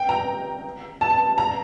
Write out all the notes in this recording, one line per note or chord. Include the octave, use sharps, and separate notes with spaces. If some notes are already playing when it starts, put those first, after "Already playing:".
Already playing: G5
A#5
A5
A#5